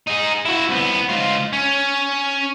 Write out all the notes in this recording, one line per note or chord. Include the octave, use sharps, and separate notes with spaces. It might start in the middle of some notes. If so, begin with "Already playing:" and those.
D#4 G#4
E4 F#4
C2 B3
G#2 F4
C#4